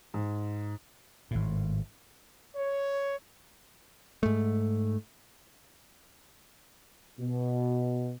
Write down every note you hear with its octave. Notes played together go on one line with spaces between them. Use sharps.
G#2
G#1 A2
C#5
G#2 A3
B2